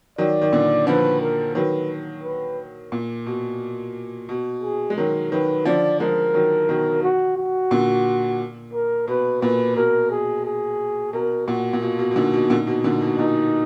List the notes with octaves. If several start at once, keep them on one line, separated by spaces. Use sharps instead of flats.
D#3 F#3 D5
D#3
A#2 D3
D3 F3 B4
A#4
D#3 F#3 B4
B4
A#2
B2
B2
G#4
G#3
D#3 F#3 A#4
D#3 F#3 B4
D3 F3 D5
F3 G#3 A#4
D#3 F#3
B2 D#3
F#4
F#4
A#2 D3
A#4
B2 B4
A#2 B4
B2 A#4
G#4
G#4
B2 A#4
A#2 F#4
A#2
B2 F4
B2
B2
A#2 D3 D#4
B2
A#2 D3
B2
A#2 D3
B2
A#2 D#4